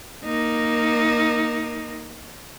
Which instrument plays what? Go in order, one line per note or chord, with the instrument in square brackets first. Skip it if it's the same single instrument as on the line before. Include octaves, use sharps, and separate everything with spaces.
[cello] A#3 D#4